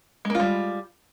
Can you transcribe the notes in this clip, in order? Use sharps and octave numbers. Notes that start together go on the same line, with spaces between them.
G3 G#3 A#3 F4